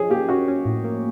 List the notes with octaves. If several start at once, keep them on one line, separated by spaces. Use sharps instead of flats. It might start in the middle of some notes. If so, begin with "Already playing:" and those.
Already playing: F3 C#4 G#4
A#3 G4
C#4 F#4
C#4
A2
A#3